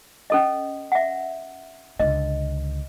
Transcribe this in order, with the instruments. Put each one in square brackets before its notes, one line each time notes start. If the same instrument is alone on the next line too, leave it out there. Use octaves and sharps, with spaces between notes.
[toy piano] C#4 A4 D#5
E5 F#5
[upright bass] C#2 D3 [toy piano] D#5